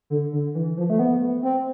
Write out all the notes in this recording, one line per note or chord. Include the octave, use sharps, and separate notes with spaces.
D3
D3
E3
F3
A3
B3
C4